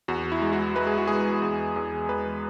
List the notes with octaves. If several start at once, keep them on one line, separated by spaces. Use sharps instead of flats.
E2 F#4
E4
G#3
F#4
G#3 B4
G#4
F#4
G#3 G#4
E2
E2
E2 B4